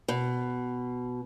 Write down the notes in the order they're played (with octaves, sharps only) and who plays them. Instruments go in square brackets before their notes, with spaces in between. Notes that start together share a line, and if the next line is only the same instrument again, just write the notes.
[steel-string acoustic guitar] B2